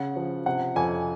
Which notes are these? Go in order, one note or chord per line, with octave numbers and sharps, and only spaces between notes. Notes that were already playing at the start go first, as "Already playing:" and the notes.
Already playing: C#3 F#5
F3
C3 F#5
F2 G#5